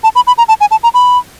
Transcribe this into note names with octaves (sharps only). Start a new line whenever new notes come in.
A5
B5
B5
A#5
A5
G#5
A5
A#5
B5